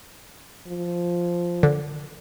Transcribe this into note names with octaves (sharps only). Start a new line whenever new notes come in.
F3
D3